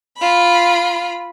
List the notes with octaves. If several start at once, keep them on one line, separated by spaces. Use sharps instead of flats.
F4 B5